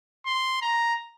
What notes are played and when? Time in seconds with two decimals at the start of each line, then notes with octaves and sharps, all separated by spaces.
0.26 C6
0.62 A#5